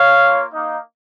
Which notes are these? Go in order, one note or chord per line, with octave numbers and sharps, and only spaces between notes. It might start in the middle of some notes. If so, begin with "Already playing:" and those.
Already playing: C#5 F5
A#3 F4
A#3 D#4